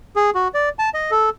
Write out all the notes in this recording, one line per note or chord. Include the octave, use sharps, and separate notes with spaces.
G#4
F#4
D5
A5
D#5
A4